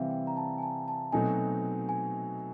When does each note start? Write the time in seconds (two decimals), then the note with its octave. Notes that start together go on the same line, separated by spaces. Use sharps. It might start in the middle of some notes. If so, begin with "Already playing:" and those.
Already playing: C3 E3 G3 C4 E5 F5
0.11 G5
0.27 A#5
0.37 A5
0.58 G#5
0.63 A5
0.88 A5
1.12 B2 F#3 A3 C4 D#4 G#5
1.89 G#5